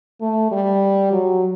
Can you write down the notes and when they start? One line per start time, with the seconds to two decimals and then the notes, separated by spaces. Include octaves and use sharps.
0.21 A3
0.52 G3
1.12 F#3